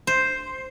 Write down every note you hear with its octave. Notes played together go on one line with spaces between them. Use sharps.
C5